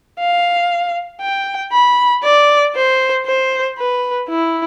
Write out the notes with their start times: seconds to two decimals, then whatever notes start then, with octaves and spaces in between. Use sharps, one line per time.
0.20 F5
1.21 G5
1.73 B5
2.23 D5
2.76 C5
3.26 C5
3.78 B4
4.29 E4